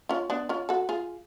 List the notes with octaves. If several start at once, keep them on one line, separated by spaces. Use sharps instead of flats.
C#4 F4
B3 D4
C#4 F4
F#4 A4
F4 G#4